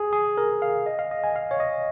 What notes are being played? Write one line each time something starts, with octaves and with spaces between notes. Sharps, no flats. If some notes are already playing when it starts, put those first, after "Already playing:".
Already playing: G#4
G#4
A#4
F5
D#5
F5
D#5
G#5
F5
C#5
D#5